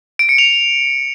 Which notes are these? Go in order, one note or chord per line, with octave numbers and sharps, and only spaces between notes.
D7
C#7
F7